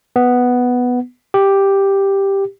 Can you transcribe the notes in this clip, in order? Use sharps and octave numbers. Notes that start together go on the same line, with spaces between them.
B3
G4